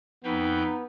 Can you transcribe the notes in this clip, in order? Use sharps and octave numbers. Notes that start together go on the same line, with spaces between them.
F2 B3 D#4 B4 G5